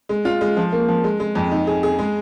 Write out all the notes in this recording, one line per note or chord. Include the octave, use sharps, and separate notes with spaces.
G#3
F4
G#3
F3
A#3
F3
G#3
G#3
F2
D#4
G#4
G#4
G#3